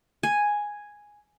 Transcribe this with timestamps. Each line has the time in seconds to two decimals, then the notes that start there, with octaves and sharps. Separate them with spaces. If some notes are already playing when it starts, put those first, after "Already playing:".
0.23 G#5